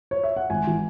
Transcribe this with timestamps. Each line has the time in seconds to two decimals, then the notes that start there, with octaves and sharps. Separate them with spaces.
0.11 C#5
0.24 E5
0.37 F#5
0.50 G#1 G#5
0.67 E3